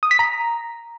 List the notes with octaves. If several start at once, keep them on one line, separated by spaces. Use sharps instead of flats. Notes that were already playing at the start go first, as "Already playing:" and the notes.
D#6
B6
A#5